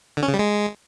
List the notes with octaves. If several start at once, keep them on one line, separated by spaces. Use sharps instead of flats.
D3
C#4
C#3
G3
G#3